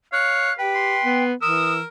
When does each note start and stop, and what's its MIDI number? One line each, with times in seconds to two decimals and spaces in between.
0.13 0.51 73
0.13 0.54 77
0.13 0.53 90
0.59 0.97 67
0.59 1.20 71
0.59 1.24 79
0.75 1.29 84
1.03 1.34 59
1.42 1.81 52
1.42 1.87 70
1.42 1.72 87
1.42 1.80 88